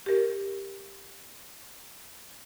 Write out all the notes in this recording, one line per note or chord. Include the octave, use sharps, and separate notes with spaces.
G4 A#4